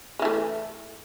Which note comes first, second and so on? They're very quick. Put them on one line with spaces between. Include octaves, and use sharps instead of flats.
G#3 E3 A3